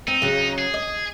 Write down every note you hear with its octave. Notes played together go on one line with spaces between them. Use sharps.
C4 D#4
C#3 F#3
G#4
D#5